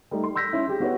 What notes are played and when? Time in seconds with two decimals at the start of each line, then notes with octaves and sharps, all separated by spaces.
0.11 G3 A3 D#4
0.24 C6
0.35 C6 E6 G6 A#6 B6
0.53 C#4 E4
0.68 G4 G#4
0.80 B3 F#4 B4 C#5